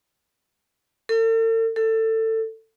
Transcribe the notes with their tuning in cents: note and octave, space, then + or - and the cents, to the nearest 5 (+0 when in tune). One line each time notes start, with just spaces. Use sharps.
A4 +45
A4 +20